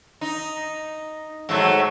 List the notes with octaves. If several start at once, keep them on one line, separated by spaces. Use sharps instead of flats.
D#4
G#2 F#3 A3